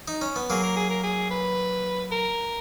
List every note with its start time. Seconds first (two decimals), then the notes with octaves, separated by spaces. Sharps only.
0.08 D#4
0.22 C#4
0.36 B3
0.50 F#3 A#3 G#4
0.63 A#4
0.76 G#4
0.90 A#4
1.03 G#4
1.31 B4
2.12 A#4